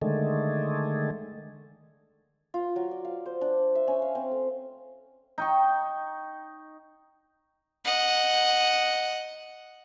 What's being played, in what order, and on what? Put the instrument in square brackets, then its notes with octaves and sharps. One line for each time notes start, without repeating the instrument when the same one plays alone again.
[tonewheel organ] D3 D#3 G#3 A3
[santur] F4
F#3
D5
F5
C5
D4
E5
C#4
F5
C4
A3
[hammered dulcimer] D#4 G5 C#6
[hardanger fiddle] D#5 F#5